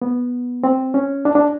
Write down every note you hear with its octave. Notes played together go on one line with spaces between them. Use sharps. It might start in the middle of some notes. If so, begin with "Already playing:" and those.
B3
C4
C#4
D4
D4